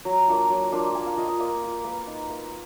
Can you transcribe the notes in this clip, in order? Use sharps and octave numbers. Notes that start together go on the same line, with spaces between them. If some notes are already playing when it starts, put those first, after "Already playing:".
F#3 A#5
A#3 D4 F4
F#3
A#3 D4 F4
A#3 G#5
F5
F4 D#5
D#5
A#3 D5
F4
A#3 B4
D#4
A#3